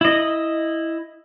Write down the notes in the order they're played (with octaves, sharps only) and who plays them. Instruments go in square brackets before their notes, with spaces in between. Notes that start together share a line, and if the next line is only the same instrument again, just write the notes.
[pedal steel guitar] E4 D#5